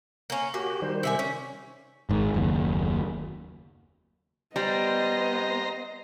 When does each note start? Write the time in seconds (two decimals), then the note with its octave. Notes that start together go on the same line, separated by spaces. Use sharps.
0.30 A#3 C#4
0.54 A#3 F#4 G4
0.82 D#3 G3 C5
1.03 C3 E5 G#5
1.19 C#4
2.09 G#1 G#2
2.34 F#1 D#2
4.56 G3 B3 C5 D#5 A#5